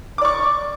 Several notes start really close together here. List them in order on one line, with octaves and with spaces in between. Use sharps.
D6 D5 C#6